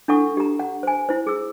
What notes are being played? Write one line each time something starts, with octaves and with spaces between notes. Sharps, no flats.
D4 E4 A4 F#5 C#6 D#6
G4 A#5
F#5
C5 G#5
E4 C5
G#4 E6